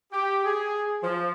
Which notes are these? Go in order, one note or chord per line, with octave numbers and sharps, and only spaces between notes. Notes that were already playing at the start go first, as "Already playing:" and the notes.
G4
G#4
F3